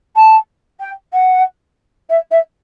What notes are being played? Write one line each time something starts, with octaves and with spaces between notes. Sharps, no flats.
A5
G5
F#5
E5
E5